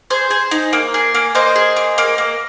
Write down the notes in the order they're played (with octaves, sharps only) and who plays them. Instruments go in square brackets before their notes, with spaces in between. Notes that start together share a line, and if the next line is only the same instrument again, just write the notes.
[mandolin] G#4 C5
G#4
D#4
A#3
G#4
A#3
A#3 C5 D#5
G#4
A#3
A#3
A#3